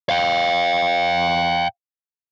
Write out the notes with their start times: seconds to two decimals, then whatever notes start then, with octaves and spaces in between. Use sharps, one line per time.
0.09 F5 G5